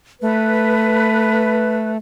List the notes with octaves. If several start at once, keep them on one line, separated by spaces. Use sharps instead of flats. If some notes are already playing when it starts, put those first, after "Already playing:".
A3 B4